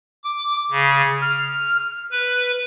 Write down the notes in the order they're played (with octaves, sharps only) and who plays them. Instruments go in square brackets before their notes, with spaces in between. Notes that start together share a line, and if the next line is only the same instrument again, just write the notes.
[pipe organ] D6
C#3
F6
B4